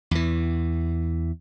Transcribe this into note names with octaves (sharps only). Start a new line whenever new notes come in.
E2 E3